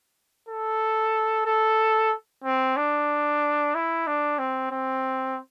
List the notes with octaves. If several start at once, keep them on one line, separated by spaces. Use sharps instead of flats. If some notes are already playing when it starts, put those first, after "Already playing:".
A4
A4
C4
D4
E4
D4
C4
C4